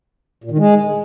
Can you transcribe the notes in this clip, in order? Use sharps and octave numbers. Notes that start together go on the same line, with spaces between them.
A#2
D#3
G#3